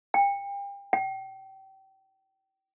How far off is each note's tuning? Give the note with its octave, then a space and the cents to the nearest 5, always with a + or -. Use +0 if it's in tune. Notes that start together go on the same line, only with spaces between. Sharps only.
G5 +35
G5 -30